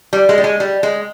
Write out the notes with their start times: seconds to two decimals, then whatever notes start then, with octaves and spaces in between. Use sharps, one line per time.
0.13 G3
0.29 G#3
0.38 G3
0.44 G#3
0.60 G3
0.83 G#3